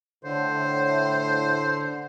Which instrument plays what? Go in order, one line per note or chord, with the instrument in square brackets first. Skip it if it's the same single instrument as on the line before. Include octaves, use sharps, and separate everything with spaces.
[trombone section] A2 [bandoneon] D3 [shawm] C5